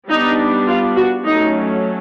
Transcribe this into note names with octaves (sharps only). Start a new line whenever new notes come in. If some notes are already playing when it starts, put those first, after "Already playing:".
G3 B3 D4 D#4
F4
F#4
F#3 A3 C#4 D#4